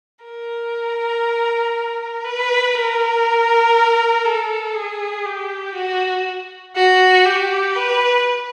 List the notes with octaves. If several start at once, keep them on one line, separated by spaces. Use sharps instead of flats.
A#4
B4
A#4
A4
G#4
G4
F#4
F#4
G4
B4